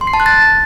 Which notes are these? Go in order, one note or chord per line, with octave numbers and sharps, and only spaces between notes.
C6
C7
A5
F#6
A6